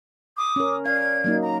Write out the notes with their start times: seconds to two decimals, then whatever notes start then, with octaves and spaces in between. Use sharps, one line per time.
0.36 D6 D#6
0.56 C#4 A#4
0.86 D5 F5 G#6
1.24 F#3 A#3 D#4
1.42 A#5